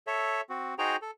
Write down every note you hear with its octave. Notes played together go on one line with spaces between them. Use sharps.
A4 C#5 E5
C4 F#4
D#4 F#4 G#4 C5 G5 A#5
A4